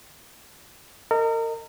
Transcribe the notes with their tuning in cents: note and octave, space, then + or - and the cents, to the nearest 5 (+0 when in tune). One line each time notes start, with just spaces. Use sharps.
A#4 -35 D#5 +0